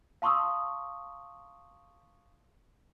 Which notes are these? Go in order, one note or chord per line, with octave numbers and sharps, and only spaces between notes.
F5 A5 C6 C#6 D#6 E6